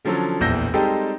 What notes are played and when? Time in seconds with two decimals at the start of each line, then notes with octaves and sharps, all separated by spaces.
0.05 D3 F3 F#3 C#4 A4
0.40 D1 A#1 E2 E6 G6 A#6
0.73 G3 G#3 C4 D#4 G4 A4